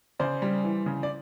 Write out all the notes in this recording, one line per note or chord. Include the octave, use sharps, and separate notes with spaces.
C#3 C5 D5
G3
E3
C#3
D5